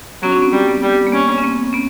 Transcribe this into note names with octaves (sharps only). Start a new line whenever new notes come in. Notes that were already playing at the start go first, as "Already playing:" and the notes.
F#3 B3 C#4
C4 D4
B3 C#4
G3 B3
B3
G3
A#3
B3 C#4
B3
C#4
A#3 C4
B3 C#4